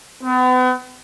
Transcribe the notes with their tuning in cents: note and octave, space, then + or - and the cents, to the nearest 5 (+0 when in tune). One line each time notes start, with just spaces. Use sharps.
B3 +40